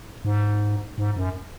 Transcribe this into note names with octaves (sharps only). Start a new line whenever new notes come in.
G#2
G#2
F#2